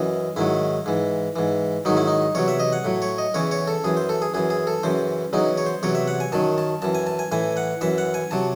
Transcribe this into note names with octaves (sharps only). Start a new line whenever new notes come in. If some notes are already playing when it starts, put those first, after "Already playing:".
Already playing: F#2 E3 D#5
G#2 D#3 F#3 E4
G#2 E3
G#2 E3
G#2 D#3 F#3 D#4
E4
D#4
E2 C3 F#3 C#5
E5
D#5
F#5
A2 F#3
C#5
D#5
E2 C#3 E3 C#5
C#5
A4
F#2 E3 G#4
C5
A4
G#4
F#2 E3 G#4
G#4
A4
F#2 C#3 E3 C5
E2 C#3 F#3 D#4
C#5
C5
E2 C3 F#3 C#5
E5
F#5
G#5
F#2 D#3 F#3 A5
A5
F#2 E3 A5
G#5
A5
G#5
A2 E3 G#5
F#5
F#2 E3 E5
F#5
G#5
C3 F#3 A5